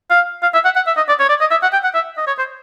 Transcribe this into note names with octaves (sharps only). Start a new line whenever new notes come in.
F5
F5
E5
F#5
F#5
E5
D#5
D5
C#5
D5
D#5
E5
F#5
G5
F#5
E5
D#5
C#5
C5